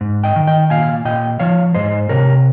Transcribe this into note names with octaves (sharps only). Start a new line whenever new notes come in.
G#2
D#5 G5
D#3
D#5 G5
A#2 F5 G#5
A#2 D#5 G5
F3 C#5 F5
G#2 C5 D#5
C3 A#4 C#5